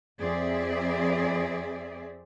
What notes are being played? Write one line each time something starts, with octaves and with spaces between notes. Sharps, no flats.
F2 C4 G#4 D5 E5